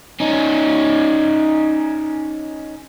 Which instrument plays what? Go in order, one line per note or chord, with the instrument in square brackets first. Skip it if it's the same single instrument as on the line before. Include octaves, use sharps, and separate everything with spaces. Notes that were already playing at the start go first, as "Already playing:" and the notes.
[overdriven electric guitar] C#4 D#4